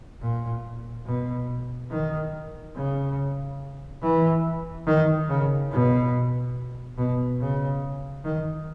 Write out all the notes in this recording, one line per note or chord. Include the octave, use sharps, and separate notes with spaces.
A#2
B2
D#3
C#3
E3
D#3
C#3
B2
B2
C#3
D#3